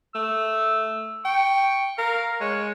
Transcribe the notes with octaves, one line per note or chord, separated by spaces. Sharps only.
A3 E6
G5 C#6
A#4 F5
G#3 C#5